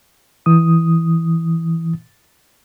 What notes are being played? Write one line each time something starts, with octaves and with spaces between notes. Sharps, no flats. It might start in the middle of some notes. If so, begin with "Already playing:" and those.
E3 D#6